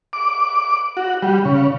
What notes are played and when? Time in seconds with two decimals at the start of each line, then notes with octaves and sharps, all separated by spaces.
0.13 D6
0.97 F#4
1.22 G3
1.45 C#3